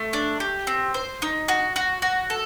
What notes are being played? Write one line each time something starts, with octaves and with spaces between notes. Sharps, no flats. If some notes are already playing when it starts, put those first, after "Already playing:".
Already playing: A3
D4
G4
C4
C5
D#4
F#4
F#4
F#4
A4